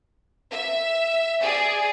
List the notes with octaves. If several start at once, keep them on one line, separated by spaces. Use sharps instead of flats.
E5
G#4 D5